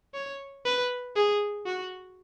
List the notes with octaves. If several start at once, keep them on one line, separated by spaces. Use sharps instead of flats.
C#5
B4
G#4
F#4